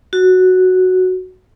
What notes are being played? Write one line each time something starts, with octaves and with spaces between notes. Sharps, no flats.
F#4